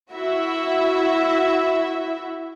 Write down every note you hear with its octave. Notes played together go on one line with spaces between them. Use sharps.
E4 F#4 E5